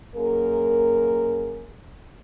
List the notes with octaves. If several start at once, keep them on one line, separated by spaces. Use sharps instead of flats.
F#2 A#3 G#4 A#4